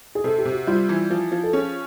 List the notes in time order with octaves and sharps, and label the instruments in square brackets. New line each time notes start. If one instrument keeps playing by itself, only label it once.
[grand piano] G#4
[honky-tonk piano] C3 [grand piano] A4
[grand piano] G4
[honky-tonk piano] C3
[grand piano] F#4
[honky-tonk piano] G3 [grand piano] F4
[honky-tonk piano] E3
F3
F3
[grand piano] A4
[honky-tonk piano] C#4 [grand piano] G#4